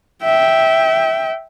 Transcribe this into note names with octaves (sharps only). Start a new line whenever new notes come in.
E5 G5